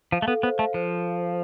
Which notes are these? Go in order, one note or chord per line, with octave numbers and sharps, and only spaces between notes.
F3 F5
A3
B3 A4
B3 C5
A3 F5
F3 C5